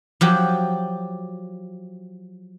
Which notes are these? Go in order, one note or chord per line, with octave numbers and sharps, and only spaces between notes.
F3 F#3 G4